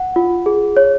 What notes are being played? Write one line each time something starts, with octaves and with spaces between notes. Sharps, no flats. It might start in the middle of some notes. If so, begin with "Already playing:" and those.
Already playing: F#5
F4
G#4
C#5